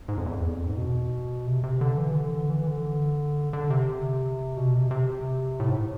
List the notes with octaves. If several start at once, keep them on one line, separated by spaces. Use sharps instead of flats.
G#2
F2
E2
F2
E2
F2
G#2
B2
C3
C3
D3
E3
D3
E3
D3
D3
C3
B2
C3
C3
A2
G#2
A2